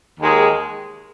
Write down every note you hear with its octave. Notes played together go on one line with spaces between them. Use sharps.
D#2 D#3 G#3